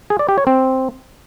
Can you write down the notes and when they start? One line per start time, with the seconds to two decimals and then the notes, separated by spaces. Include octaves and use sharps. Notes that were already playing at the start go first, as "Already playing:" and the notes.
0.10 G#4
0.19 D5
0.29 G4
0.38 C#5
0.47 C4